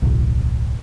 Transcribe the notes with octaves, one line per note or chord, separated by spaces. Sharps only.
D1 B1